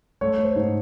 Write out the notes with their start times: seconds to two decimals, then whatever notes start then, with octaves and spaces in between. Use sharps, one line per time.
0.21 A3 C#5
0.38 A3
0.43 C5
0.56 G#2